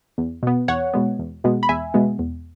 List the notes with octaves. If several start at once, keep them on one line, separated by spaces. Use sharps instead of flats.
E2
B2 B3
E2 C#5 F#5
B2 G#3 B3
E2
B2 G#3 B3
B5
E2 E5 G#5
B2 G#3 B3
E2